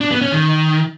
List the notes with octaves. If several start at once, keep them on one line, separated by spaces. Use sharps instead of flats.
D4
B3
C#4
D#3